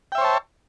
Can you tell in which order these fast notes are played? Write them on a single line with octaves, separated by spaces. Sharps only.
G5 E5 C5 C#5 A5